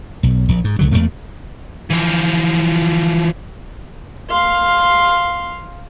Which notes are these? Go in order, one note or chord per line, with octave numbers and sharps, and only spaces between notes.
B1
A#1
G#2
C#2 D3 F#3
E2 A2 A3 A#3
E3 F3
F5 C6